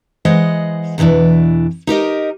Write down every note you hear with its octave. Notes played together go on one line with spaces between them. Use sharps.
E3 G#3 C5 D#5 F#5
E2 B2 D3 E3 D4
D#4 G4 A#4 D#5